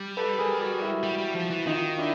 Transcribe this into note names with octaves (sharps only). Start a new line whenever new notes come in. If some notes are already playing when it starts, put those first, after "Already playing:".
Already playing: G3
A4 B4
G#4 A#4
F#4 G#4
E4 F#4
G3
G3
F3
E3
D#3 D#4 F4
D4 E4